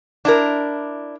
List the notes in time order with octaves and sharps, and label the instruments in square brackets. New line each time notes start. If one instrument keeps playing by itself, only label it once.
[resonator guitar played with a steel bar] D4 E4 A#4